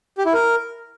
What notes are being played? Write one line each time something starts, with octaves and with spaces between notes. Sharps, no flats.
G4
E4
A#4